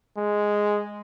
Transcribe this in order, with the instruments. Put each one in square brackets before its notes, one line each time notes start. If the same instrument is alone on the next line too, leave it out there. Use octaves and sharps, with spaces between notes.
[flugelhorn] G#3